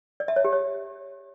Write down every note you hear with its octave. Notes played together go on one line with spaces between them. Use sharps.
D5
E5
C#5
G4
C#5